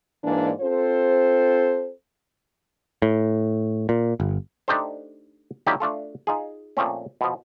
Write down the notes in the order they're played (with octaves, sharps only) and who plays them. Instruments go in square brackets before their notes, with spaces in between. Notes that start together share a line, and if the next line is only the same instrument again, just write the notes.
[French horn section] G#2 E3 A#3 D4 D5
C4 F4 A4 C5
[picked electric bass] A2
A#2
G1
[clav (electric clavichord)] A3 D4 D#4 G4 A4 C5
D3 D#3 F#3 A#3 E4 G4
A3 D4 F4 A4
D#4 F4 G#4
A#2 F3 A3 C4 C#4
B2 F3